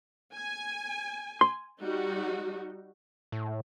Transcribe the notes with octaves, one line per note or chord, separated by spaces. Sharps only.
G#5
C6
G3 D#4 F#4
A2